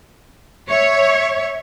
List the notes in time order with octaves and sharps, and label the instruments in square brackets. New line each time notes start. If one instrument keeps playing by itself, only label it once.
[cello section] C#5 [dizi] E5